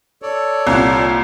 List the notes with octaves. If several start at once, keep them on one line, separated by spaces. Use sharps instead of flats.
A4 C#5 D5
C2 A#2